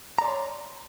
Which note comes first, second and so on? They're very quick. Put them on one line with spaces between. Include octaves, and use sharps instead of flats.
A#5 D5 C6 C#5